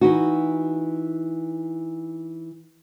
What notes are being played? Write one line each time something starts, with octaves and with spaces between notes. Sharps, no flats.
E3 D#4 F#4